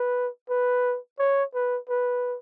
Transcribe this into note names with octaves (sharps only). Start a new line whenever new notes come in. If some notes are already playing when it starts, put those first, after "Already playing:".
Already playing: B4
B4
C#5
B4
B4